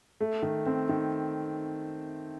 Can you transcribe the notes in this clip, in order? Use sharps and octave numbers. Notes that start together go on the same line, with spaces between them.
A3
D#3
C4
D#3